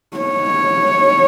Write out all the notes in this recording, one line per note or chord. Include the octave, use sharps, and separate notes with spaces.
C#5